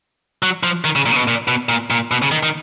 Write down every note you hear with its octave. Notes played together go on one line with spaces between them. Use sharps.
F#3
F3
D#3
C#3
A#2
C#3
B2
A#2
B2
A#2
A#2
B2
C#3
D#3
D#3